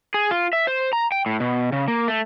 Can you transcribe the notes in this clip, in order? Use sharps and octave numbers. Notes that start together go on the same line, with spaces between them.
G#4
F4
E5
C5
A#5
G5
A2
B2
C#3
A#3
A3